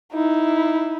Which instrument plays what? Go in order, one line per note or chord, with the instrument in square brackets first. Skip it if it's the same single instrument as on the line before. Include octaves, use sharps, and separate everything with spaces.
[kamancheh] D#4 E4